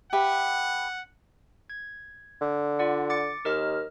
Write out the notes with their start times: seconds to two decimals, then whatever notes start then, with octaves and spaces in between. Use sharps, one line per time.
0.13 G4 B4 E5 F#5
1.70 G#6
2.41 D3
2.79 F4 D5 F#5
3.10 D6 A6 C#7
3.45 D#2 A#4 D#5 F6